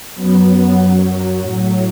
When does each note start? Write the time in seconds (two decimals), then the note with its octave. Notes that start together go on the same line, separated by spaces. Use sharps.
0.15 F#2 F#3 B3
0.79 F#2 F#3
1.42 A2 F#3